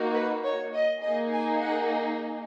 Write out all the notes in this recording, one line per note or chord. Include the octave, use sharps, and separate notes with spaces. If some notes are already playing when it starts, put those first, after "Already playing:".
Already playing: A#3 D#4 F#4
B4
C#5
D#5
A#3 D#4 G#4 D#5
G#5
F#5